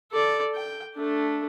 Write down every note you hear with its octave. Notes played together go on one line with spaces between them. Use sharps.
A4 D5
G5
A3 D4